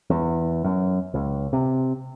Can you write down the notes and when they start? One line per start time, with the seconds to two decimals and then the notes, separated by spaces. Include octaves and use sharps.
0.10 E2
0.64 F#2
1.14 C#2
1.53 C3